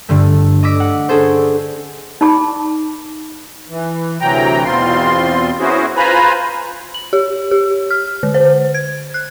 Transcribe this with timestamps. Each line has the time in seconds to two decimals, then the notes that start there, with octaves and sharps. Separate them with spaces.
0.09 G2 D3 A3
0.63 D#5 D6 E6 B6
0.80 F#5
1.09 C#4 D4 G#4 A4 C5
2.21 D#4 D5 A5 B5 D6
3.69 E3
4.21 D2 C3 E3 F#3 G5 A#5
4.65 E2 B2 C4 F4 C6
5.60 B3 C#4 E4 F#4 G#4 C5
5.97 F4 B4 C5 G#5 A#5 B5
6.94 F#7
7.13 G4
7.51 G4
7.90 F6
8.23 D3
8.34 C5
8.74 G#6
9.14 F#6